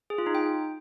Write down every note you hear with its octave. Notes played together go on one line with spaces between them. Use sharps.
G#4
F4
D#4
G5